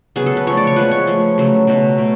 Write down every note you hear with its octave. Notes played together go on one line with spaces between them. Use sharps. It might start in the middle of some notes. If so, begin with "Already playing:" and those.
C#3 F#3 B3 G#4
A4
B4
F3 A3 C#5
D5
C#5
F3 G#3 B3 B4
C#5
F3 A3
C#3 F#3 A3
B2 F#3 A3
B2 A3